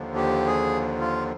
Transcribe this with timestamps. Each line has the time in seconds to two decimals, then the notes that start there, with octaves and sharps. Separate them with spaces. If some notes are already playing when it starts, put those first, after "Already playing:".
Already playing: D#2 D3 F3
0.15 G4
0.46 G#4
0.99 F4